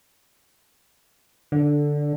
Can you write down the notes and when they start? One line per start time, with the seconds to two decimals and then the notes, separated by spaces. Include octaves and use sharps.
1.52 D3